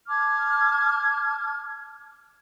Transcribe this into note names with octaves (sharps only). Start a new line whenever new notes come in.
A5 D6 F6 G#6